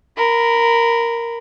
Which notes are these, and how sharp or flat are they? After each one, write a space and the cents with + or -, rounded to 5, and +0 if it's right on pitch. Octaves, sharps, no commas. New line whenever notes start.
A#4 +0 B5 +20